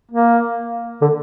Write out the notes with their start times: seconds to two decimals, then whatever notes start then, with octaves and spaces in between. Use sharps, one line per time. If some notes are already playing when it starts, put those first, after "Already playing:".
0.12 A#3
1.01 D3